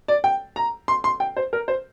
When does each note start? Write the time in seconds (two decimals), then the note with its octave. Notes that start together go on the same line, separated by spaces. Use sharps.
0.08 D5
0.24 G5
0.56 A#5
0.88 C6
1.04 C6
1.20 G5
1.37 C5
1.53 A#4
1.68 C5